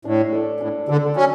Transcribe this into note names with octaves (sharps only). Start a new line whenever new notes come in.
A2 D4
A4 D5
A2 D4
D3 A4 D5
F#3 C#4